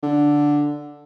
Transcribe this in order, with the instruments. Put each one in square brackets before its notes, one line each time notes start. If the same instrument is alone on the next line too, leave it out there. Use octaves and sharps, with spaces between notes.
[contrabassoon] D3